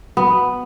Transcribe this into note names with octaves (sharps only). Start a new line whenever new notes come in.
B3